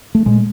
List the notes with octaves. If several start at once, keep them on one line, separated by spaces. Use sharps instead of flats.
A3
A#2 G#3